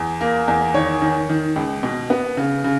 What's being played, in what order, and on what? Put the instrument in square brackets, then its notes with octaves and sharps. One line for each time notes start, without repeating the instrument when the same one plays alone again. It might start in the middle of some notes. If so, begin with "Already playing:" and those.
Already playing: [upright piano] E2
A#3
E2
D#3 C#5
D#3
D#3
C#2
B2
B3
C#3
C#3